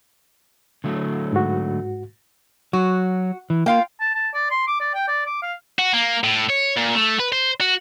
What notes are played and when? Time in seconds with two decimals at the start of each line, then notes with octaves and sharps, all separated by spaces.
0.84 D3 F#3 A3
1.33 G#2 F#4
2.73 F#3 F#4
3.50 E3
3.66 A#3 F4 F5 G5
4.00 A5
4.15 A5
4.34 D5
4.51 C6
4.67 D6
4.80 D5
4.94 G5
5.08 D5
5.26 D6
5.42 F5
5.79 F#4
5.94 A#3
6.24 A2
6.50 C#5
6.77 A#2
6.95 A3
7.19 B4
7.32 C5
7.61 F#4